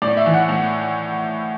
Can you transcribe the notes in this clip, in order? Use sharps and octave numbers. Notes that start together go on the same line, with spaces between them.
A2 D5
E5
E3
F#5
A2